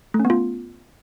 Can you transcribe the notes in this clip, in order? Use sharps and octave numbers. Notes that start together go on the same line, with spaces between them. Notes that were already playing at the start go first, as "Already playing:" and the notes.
A3
C#4
B3
F4